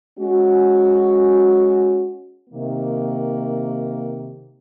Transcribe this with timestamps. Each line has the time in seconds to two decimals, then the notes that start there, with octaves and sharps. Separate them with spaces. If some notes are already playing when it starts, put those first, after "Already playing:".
0.19 G#3 C#4 F#4
2.49 C3 D#3 A#3